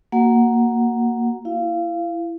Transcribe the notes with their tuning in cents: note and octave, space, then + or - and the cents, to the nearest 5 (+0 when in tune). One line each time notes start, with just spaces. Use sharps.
A#3 +0 F#4 +0 F#5 +0
E4 +25 F5 -15